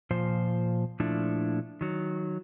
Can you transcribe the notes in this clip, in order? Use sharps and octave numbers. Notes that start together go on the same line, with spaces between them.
A#2 F3 C5
A#2 F3 A3 D4 E4
D#3 F#3